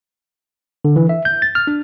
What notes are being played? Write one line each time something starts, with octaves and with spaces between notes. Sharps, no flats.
D3
E3
E5
G6
A6
F6
D4